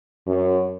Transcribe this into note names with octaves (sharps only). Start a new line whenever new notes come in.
F#2